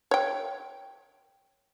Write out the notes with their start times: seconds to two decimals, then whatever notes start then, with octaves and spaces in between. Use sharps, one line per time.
0.11 C#5 G5